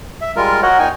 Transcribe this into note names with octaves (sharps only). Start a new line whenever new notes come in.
E5
G3 G#3 F4 A#4
F#4 A#4 C#5 D#5 F#5
A#2 D#4 G5 G#5